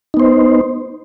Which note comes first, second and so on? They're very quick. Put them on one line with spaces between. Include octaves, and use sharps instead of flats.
D#4 B3 C5